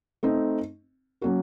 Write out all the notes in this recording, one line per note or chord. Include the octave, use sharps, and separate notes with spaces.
A3 C4 D#4
F#3 A#3 C#4 F#4 A#4